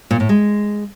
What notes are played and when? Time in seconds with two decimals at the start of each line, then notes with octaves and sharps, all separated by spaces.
0.11 A#2
0.20 A2
0.29 G#3